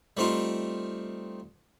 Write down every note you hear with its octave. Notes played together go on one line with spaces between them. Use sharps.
G3 A3 C4 D#4 F4